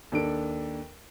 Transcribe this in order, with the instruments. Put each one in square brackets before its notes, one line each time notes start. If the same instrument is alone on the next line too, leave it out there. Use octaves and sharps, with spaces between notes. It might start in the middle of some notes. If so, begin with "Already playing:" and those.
[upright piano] D#2 D4 A4 D7